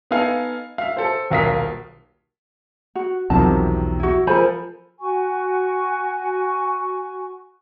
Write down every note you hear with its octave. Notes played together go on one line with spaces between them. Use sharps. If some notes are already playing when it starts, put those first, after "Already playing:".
B3 D#4 A4 F5 G#5
E5 F5
A4 C5
D#1 B1 A#4 F5 D#6 B6
F#4
B1 E2 C3 D#3 F3 F#3 A5
E4 F#4
F3 A4 A#4 C5 G#5 B5
F#4 G#5 C#6